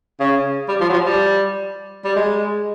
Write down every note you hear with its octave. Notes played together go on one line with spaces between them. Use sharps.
C#3
G3
F3
F#3
F3
G3
G3
G#3